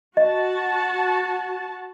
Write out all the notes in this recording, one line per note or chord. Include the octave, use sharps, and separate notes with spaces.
F#4 D#5 A5